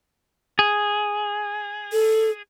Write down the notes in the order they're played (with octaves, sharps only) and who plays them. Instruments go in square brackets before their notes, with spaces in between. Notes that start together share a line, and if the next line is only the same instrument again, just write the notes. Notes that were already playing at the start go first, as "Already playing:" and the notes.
[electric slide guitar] G#4
[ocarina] A4